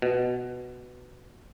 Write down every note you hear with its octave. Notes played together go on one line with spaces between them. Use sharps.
B2